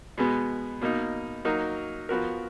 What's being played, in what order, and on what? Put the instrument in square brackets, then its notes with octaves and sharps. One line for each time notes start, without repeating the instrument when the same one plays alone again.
[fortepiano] B2 G#3 B3
B2 A#3 D#4
F#3 A#3 D#4 F#4 A#4
F3 B3 F#4 A#4